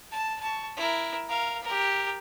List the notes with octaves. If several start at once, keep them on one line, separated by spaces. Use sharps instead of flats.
A5
A5 C#6
E4 A#4
A#4 F5
G4 A#4